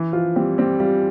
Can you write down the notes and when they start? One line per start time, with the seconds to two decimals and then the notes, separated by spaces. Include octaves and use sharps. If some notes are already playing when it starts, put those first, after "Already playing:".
Already playing: E3
0.13 F3 F4
0.36 G3 C4
0.58 G3 C4
0.80 G3 F4